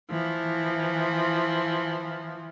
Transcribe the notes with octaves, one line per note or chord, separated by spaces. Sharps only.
E3 F3